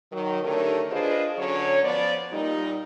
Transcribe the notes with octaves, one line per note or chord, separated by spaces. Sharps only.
D#3 F#3
D3 D#3 A3 G4 A#4 C#5
D4 F4 G#4 B4 C5 D#5
D3 F#3 C#4 C#5
F3 B3 D5
A#2 G3 D#4